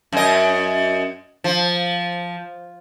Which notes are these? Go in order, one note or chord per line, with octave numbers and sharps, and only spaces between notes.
F#2 D#5
F3